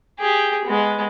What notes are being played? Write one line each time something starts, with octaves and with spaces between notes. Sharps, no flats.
G4 G#4
G#3 B3